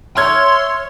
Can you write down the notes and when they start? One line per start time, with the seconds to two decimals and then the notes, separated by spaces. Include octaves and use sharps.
0.17 C#5 E5 C6 F6 G#6